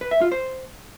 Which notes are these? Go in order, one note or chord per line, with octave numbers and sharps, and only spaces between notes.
B4
E5
F4
C5